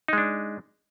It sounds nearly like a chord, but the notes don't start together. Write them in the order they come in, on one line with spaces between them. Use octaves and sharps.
D#4 G#3 D4